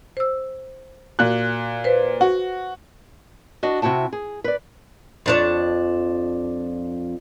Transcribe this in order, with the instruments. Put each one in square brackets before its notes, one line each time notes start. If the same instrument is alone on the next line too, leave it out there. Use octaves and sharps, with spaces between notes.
[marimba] C5 E6
[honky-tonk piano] A#2 F#6 [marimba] F#4
[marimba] B4 C5
[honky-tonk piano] F#4
[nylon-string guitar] D4 F#4 D#5
C3 E4 F#4 G5 A5
G#4
B4 D5
[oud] F2 D4 C#5